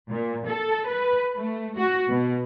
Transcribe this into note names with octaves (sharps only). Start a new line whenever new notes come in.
A#2
A4
B4
A3
F#4
B2